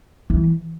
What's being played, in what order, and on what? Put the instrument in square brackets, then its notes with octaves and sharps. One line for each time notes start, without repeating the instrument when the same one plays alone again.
[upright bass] E3